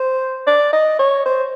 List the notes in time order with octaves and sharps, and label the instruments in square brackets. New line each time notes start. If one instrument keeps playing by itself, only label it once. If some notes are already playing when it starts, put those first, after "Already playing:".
Already playing: [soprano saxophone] C5
D5
D#5
C#5
C5